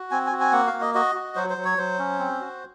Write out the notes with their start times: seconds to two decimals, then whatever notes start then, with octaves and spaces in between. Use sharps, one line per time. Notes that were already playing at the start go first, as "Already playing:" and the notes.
Already playing: F#4
0.11 C4 G#5
0.27 G#5
0.32 F#4
0.40 G#5
0.52 A#3 F#5
0.67 F5
0.73 A#3
0.81 D#5
0.95 F#4 D#5
1.15 F#4
1.36 F#3 C5
1.50 C5
1.58 F#3
1.64 C#5
1.78 F#3 C5
1.99 C#4
2.19 C4
2.41 F#4